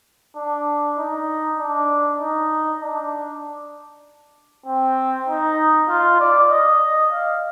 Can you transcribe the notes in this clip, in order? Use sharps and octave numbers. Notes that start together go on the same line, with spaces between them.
D4
D#4
D4
D#4
D4
C4
D#4
F4
D5
D#5
F5